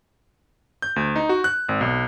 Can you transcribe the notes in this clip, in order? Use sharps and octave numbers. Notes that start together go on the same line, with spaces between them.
G6
D2
D#4
F#4
F#6
G#1
B1